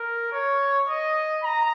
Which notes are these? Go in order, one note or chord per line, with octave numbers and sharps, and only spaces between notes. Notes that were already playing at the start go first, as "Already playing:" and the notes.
Already playing: A#4
C#5
D#5
A#5